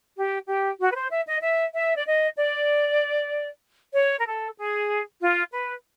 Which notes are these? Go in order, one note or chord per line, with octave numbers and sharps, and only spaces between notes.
G4
G4
F#4
B4
C5
E5
D#5
E5
E5
D5
D#5
D5
C#5
A#4
A4
G#4
F4
B4